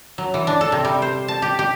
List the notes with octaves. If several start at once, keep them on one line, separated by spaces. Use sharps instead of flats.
F#3
E3
D4
A4
C3
G3
C5
A5
G4
G4